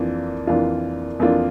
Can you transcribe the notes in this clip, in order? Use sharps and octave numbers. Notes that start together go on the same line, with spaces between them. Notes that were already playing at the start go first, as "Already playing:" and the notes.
Already playing: F2 E3 A#3 D4 F4
F2 E3 A#3 D4 F4
F2 E3 A#3 D4 F4